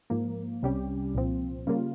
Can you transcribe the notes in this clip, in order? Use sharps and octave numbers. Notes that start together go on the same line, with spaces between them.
G#2 F3 A#3
C2 C3 G3 C#4 G4
C2 A#2 F3 C4
C#3 G3 A#3 F4